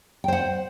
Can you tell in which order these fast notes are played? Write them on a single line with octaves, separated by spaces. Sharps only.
G5 C5 F#5